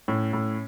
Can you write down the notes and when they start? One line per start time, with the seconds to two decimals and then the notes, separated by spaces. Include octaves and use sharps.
0.08 A2 C#4
0.33 A2